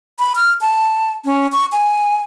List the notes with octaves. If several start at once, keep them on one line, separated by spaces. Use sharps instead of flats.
B5
F6
A5
C#4
C#6
G#5